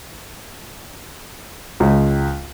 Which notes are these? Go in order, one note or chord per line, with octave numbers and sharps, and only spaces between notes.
C#2